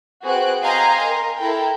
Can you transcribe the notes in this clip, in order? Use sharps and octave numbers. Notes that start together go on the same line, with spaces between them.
C4 F#4 G#4 B4 F#6 D7
D#5 F5 G5 G#5 A#5 C6
A#4
E4 A4 A#4 G5